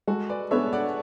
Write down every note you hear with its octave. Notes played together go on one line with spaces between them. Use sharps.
G#3 F#4 A4
B4 D5
B3 D4 A4 C#5 E5
D5 F#5